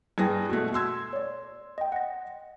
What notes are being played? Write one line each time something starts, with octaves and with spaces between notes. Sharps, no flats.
G2 E4 G#4 B4 G5 A#6
B2 A3
C6 E6 G#6
C#5 D5
D#5 G5
F#5 A#6